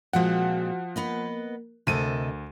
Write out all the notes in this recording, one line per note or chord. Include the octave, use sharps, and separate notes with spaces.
A#2 F3 G#3 C4 F#4 F5 F#5
A#3 B3 A#4 B4 D#5
D2 C3 A4 A#4 D#5 D#7